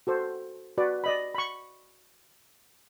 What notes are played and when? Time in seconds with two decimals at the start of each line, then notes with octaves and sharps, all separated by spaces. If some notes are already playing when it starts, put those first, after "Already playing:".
0.07 F#4 A4 C5
0.78 F#4 B4 D5
1.04 D5 D#5 B5
1.35 B5 C#6